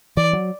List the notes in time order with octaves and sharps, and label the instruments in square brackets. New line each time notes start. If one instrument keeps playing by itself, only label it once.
[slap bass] E3 [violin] D5
[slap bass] F#3